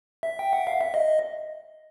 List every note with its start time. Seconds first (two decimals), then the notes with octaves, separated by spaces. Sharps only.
0.23 E5
0.39 G5
0.53 F#5
0.67 F5
0.81 E5
0.94 D#5